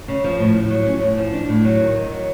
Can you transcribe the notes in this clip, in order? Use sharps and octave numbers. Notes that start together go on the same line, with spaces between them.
C#3
F3
A2
A2
F#3
C#4
A2
F3
D4
A2
F#3
D#3
D#3
F#3